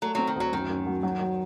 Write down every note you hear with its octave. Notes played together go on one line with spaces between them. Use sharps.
F#3 A3
F#3 C4
D#3
D2 F#3
F#2 D#3
F#2
F#3
F#3
F#3